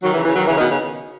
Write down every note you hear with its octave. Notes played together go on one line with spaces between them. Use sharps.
D#3 F#3
C#3 E3
C#3 E3
D#3 F#3
C#3 E3
B2 D#3
C#3